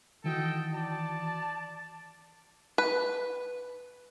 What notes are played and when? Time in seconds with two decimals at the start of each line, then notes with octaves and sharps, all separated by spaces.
0.24 D#3 E3 F#4 A4 D#5 G5
0.72 D5 A5
2.78 B4